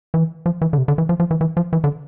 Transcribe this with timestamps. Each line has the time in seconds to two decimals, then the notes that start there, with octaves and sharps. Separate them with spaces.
0.14 E3
0.46 F3
0.62 E3
0.73 D3
0.78 C3
0.88 D3
0.98 E3
1.09 F3
1.20 F3
1.31 E3
1.41 E3
1.57 F3
1.73 E3
1.84 D3